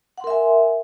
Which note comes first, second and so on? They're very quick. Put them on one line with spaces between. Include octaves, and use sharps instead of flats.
F#5 C6 A#4 E5 G#5